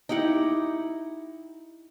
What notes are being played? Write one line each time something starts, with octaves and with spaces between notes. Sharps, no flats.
D#4 E4 G4 F#5